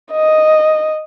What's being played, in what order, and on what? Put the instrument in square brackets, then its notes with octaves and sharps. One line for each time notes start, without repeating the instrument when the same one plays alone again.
[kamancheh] D#5